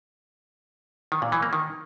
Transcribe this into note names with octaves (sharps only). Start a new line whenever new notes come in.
D#3
A#2
E3
A#3
D#3